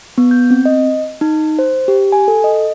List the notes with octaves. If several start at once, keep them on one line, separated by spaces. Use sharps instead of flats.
B3
G6
C4
D#5
D#4
C5
G4
G#5
A4
D#5